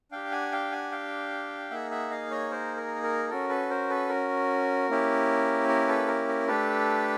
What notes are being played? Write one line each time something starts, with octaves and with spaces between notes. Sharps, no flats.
D4 G4 F5 G5
F#5 G#5
F5 G5
F#5 G#5
F5 G5
A#3 D#4 G#4 E5 F#5
E5 F#5
D#5 F5
C#5 D#5
A#4 C5
A#4
A#4
C#4 F#4 A4 A#4
A4 B4
A#4 C5
A4 B4
A#4
A#3 C#4 E4 G4
A#4
A4 B4
A#4
A#4
A3 D4 G4 A4 B4